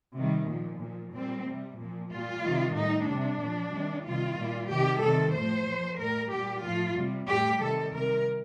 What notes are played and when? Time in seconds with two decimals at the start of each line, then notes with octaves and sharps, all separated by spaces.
0.16 C3 D#3 G3
0.50 A#2 F3
0.81 A#2 F3
1.13 A#2 G3 C4
1.46 C3 G3
1.78 A#2 F3
2.11 A#2 G3 F4
2.44 C3 D#3 G3
2.75 A2 G3 D#4
3.07 C3 G3 D4
3.41 A#2 F3
3.73 C3 D#3 G3
4.05 C3 D#3 G3 F4
4.37 A#2 G3
4.70 C3 D#3 G3 G4
5.02 C3 D#3 G3 A4
5.34 A2 F3 C5
5.66 A#2 F3
5.99 A2 G3 A#4
6.31 A#2 G3 G4
6.64 A2 F3 F4
6.96 C3 G3
7.28 A2 G3 G4
7.61 C3 D#3 G3 A4
7.94 C3 G3 A#4